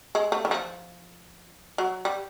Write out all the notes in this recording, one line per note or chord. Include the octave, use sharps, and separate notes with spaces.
G#3
A3
E3
F3
F#3
G3